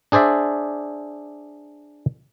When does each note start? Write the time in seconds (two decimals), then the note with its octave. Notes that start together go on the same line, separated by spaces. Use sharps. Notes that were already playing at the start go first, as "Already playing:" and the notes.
0.12 D4 G#4 C5 D5 E5